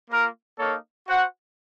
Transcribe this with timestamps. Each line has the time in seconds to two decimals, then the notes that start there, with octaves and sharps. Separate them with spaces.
0.10 A#3 F4 A#4
0.59 A#3 D#4 A4 C#5 F5
1.07 F#4 C5 F#5